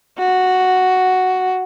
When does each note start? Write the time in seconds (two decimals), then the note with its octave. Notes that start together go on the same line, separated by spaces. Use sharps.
0.19 F#4